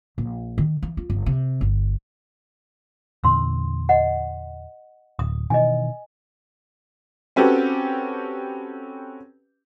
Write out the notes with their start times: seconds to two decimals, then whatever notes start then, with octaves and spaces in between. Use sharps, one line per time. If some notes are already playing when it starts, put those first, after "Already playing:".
0.18 A#1
0.58 D#3
0.83 E3
0.97 F4
1.10 G1
1.26 C3
1.61 G1
3.24 E2 A#2 D3 C6 E6
3.89 D#5 F#5
5.19 D1 D#6
5.50 B2 D#3 E3 D#5 G#5
7.36 C4 C#4 F#4 G4 A4 B4